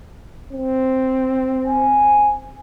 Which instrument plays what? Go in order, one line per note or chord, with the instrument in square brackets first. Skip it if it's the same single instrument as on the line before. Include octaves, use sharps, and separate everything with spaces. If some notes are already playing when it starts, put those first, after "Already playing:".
[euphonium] C4
[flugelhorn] G#5